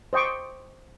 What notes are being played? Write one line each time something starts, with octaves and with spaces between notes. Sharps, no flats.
C5 D#5 G5 C#6 D6